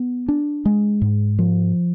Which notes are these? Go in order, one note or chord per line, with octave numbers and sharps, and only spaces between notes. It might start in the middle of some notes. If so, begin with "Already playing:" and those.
Already playing: B3
D4
G#3
G#2
F3